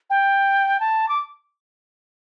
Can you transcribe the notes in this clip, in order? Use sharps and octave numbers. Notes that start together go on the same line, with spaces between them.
G5
A5
D6